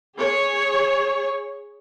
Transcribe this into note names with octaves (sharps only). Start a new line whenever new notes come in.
G#4 C#5